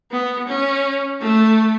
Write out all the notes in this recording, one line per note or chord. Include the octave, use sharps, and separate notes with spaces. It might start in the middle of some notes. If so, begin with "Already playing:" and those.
B3
C#4
A3